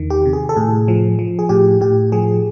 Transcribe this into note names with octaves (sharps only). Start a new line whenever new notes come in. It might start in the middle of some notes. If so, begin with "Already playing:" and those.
Already playing: E2 D#3
G4
C3
G#4
A4
A2 G#4
F3
F3
G#4
A2 G4
A2 G4
F3 G#4